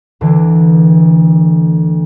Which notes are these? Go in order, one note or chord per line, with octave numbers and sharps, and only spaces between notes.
D2 D3 E3